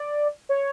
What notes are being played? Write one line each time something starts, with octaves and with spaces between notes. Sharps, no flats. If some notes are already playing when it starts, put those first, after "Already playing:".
Already playing: D5
C#5